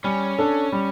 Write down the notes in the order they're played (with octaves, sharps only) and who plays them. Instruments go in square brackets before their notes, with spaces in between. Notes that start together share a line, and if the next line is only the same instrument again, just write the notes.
[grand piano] G3 [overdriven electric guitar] C#4
[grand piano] D4 A4
G3